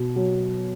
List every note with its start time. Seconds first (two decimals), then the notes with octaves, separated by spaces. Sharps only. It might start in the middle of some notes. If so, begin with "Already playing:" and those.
Already playing: B2
0.16 F#3